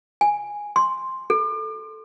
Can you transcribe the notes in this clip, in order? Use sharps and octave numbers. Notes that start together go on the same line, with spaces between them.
G#5
C6
A4